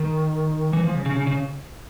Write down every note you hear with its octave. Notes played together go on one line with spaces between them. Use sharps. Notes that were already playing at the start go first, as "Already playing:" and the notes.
Already playing: D#3
E3
F3
C#3
C#3
C#3
C#3